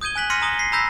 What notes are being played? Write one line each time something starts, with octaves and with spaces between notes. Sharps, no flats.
D#6 G6 G#6 D#7 G7
G#5 F#6 B6 F#7
C6 F6 A#6 B6 C#7 D#7
A#5 D#6 G7
B6 C7
A#5 B5 E6 G6 A#6 B6